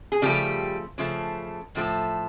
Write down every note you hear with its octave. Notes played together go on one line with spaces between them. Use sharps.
G#4
C#3 F3 G3 A3 G4
C#3 F3 A3
A2 F3 A3